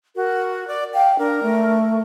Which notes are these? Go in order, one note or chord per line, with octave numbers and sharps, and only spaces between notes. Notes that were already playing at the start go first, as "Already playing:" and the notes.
F#4 A#4
D5
F5 G5
D4 A#4
A3